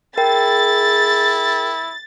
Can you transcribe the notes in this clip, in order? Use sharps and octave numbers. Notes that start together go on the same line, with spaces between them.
E4 G#4 A#4 G5 A6